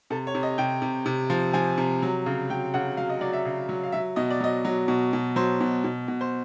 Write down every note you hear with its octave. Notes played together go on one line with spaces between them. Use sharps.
C3 A4
C#5
C3
D#5
C3 G5
C3
C3
F3
F3 G#5
C3
F#3
C#3
F#3 G5
C#3 F#5
F#3 F5
D#5
F#3 D5
E5
C#3
F#3
F5
F#3 E5
B2 D#5
D5
F#3 D#5
F#3
B2
B2
F#3 C5
B2
B2
B2
C5